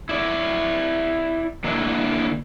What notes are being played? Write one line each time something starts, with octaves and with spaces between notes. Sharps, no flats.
E4 D5
D3 A#3 D4 E4